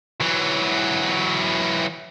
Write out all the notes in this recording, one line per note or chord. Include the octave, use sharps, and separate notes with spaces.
E3 F#3